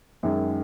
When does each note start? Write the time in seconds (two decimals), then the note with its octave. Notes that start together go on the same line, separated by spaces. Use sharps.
0.23 F#2 D#3 G#3